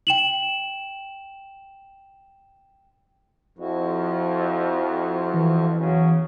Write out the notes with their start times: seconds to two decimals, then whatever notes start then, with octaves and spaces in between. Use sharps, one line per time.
0.07 G5 E7 F#7
3.59 F2 F3 E4 F#4
5.34 E3
5.79 E2 C#3 F#3 F#4